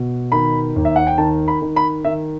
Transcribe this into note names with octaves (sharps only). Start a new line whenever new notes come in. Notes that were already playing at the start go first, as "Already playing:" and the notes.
Already playing: B2
D#3 B5
D#2
E5
F#5
G5
D#3 A5
B5
D#3
B5
D#3 E5